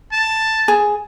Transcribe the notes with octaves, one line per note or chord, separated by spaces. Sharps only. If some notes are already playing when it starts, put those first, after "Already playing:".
A5
G#4